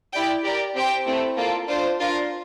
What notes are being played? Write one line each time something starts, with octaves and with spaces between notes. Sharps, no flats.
E4 G4 D5 G5
G4 A#4 D5
C4 G4 C5 G5
A3 C4 E4
A#3 F4 A4 D5
D4 F4 C5
D4 F4 A#4